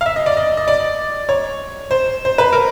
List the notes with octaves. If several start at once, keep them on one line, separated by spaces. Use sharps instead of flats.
F5
E5
D#5
D5
D#5
D#5
D5
C#5
C5
C5
B4
A#4